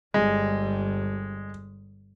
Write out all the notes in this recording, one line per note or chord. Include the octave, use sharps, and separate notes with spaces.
G1 G3 G#3